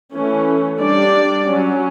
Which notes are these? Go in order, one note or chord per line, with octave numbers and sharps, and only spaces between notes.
E3 A3 C#4
G3 D4 D5
F#3 C#4